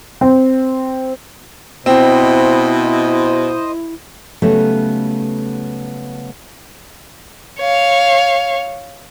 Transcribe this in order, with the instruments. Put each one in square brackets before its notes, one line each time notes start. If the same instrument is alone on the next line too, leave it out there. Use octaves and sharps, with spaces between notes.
[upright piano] C4
[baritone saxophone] B2 [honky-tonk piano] C4 [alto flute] E4 [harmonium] C5 D#5
[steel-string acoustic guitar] C#3 F#3 G3 A3 B3
[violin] C#5 F5